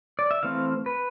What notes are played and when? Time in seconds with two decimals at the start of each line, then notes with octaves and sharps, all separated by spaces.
0.19 D5
0.31 E5
0.43 E3 A3 C4 F5
0.86 B4